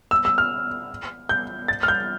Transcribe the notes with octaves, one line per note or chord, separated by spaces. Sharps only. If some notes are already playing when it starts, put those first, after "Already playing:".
E6
E6
F6
G6
A6
F6
G6